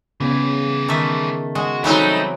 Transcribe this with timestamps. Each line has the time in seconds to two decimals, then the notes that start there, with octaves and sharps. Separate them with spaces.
0.20 C#3 E3 G3 B3
0.88 D#3 A3 E5
1.55 G#3 F#4
1.84 E3 F#3 G3 A3 C4 D#4